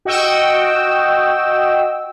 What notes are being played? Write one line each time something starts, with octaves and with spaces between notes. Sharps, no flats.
F#4 D#5 G5 E6